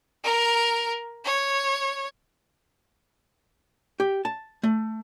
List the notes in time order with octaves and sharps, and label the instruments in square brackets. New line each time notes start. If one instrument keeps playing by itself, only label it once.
[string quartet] A#4
C#5
[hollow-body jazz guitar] G4
A5
A3